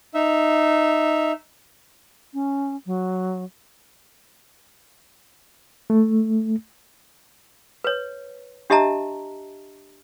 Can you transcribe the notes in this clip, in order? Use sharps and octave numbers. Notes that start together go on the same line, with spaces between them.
D#4 E5
C#4
F#3
A3
B4 C#5
D4 G4 D#5 E5 A5 A#5